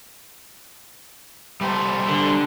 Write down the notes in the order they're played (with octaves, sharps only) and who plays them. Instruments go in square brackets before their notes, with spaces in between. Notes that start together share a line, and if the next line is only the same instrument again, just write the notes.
[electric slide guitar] G3 A3 C5
[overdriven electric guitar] D3